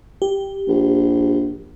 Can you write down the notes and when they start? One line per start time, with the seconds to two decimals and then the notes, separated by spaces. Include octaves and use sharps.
0.22 G4
0.68 A#1